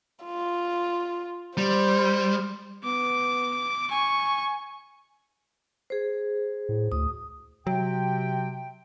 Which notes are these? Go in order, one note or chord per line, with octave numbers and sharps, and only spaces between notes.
F4
G3 C5
B3 D6
G#5 C#6
G#4 C5
A2
D2 D#6
C3 F#3 G5